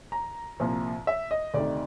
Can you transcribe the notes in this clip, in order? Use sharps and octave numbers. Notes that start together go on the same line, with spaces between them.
A#5
C2 A#2 F3
E5
D#5
D2 C3 D#3 D5